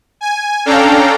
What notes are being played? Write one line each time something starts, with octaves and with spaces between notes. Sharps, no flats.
G#5
C#4 D4 A4 F5 G5 A#5